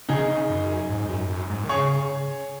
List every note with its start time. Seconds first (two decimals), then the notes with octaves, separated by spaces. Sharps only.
0.09 C#3 D#4 G#4
0.17 D#3
0.25 C#3
0.50 F#2
0.89 G#2
1.09 F#2
1.29 F#2
1.50 G#2
1.64 D#3
1.69 C#3 G#4 C#5